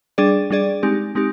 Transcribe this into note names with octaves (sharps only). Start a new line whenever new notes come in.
G3 D4 G#4 D5
G3 D4 G#4 D5
G#3 C4 D#4 G4
G#3 C4 D#4 G4